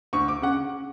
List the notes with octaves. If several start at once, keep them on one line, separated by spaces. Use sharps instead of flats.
D2 C#6
D6
C#3 F#5